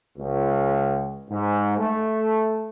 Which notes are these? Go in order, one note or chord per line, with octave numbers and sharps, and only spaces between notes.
C#2
G#2
A3